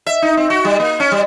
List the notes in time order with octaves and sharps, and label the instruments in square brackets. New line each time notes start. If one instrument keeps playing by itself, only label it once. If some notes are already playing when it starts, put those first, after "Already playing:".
[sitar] E5
D#4
C4
F#4
G3
A#3
C#4
G3